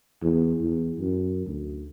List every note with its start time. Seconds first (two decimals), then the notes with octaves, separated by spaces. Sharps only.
0.22 E2
0.61 E2
0.99 F#2
1.46 D2